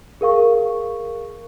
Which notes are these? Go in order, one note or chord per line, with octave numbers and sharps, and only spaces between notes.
G#4 A#4 F5 C#6